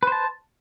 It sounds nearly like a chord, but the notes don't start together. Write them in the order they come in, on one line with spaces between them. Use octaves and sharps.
B4 C5 A5